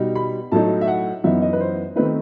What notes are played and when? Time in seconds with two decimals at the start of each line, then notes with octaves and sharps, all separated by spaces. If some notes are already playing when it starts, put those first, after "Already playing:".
Already playing: B2 G3 D#4
0.15 B5
0.52 A2 F#3 A3 D#4 A5
0.81 E5
0.88 F#5
1.24 F#2 E3 B3 D#4 E5
1.42 D#5
1.53 B4
1.60 C5
1.96 D#3 A3 C4 D#4 B4